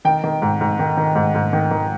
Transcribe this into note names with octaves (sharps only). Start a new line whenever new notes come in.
D#3 G5
D#3
G#2
G#2
D#3
D#3
G#2
G#2
D#3
D#3